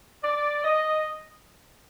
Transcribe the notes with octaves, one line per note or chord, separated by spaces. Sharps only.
D5
D#5